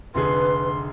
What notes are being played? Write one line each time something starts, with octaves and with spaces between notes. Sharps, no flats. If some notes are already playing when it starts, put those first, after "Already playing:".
F1 D3 G#4 B4 C6